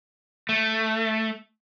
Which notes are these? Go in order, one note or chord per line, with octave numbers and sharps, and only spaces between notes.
A3